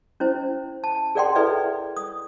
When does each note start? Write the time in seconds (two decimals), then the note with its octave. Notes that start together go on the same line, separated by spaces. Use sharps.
0.20 C#4 E4 C5
0.84 A5
1.15 G#4 A#4 D5 F#5 G5 C6
1.35 E4 G#4 A4 B4 D5 E5
1.97 D#6